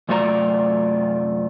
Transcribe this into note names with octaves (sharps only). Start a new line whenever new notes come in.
F#2 C3 A3 F4 D5 A#5